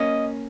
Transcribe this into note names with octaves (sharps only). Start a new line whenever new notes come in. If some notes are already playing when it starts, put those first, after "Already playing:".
Already playing: A#3 C#4 D#5